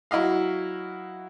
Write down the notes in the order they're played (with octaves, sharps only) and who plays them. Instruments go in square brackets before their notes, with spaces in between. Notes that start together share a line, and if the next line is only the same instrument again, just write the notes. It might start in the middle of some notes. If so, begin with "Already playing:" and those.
[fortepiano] F#3 E4 F#4 D#5 F5